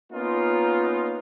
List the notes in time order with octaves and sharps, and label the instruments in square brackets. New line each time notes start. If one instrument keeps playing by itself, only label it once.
[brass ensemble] A#3 B3 C#4 D#4 F4